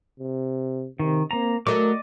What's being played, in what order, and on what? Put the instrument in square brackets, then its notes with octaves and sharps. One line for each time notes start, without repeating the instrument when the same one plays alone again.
[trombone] C3
[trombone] C3 [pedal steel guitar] D#3
[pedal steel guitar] A#3 A#5 [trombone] C4
[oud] F#3 A3 [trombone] A#4 [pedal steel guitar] D5 D#5 D6